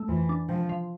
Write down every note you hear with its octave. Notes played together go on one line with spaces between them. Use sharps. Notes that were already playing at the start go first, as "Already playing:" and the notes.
Already playing: A3
F2 E3
D4
C3 F3
F3